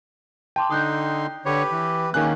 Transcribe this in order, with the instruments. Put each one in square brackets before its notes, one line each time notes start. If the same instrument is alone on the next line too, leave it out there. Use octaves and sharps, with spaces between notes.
[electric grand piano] G5 [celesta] A5 C6 D6
[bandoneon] D3 D#4 C6 [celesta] D#6 F#6 G6
[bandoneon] D3 C#5 [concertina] G4 B4
[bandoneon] E3
[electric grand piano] D#3 F#6 [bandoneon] A#3 C#4 [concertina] G#4